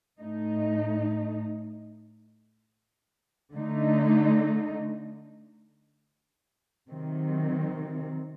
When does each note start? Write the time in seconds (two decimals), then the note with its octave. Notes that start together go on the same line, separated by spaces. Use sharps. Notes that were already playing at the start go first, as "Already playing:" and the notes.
0.20 A2 A3 D#4
3.55 D3 A3 D#4
6.91 C3 D#3 F#3 C4